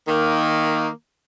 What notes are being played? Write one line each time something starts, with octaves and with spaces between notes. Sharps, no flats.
D#3 A#3